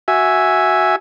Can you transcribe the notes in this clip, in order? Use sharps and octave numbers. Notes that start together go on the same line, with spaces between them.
F#4 E5 G#5